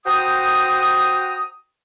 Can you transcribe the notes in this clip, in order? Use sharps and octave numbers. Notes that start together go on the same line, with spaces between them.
F#4 C5 G5 A#5 D#6